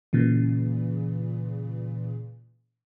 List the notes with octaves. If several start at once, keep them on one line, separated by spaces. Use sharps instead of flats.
A#2 C#3 E3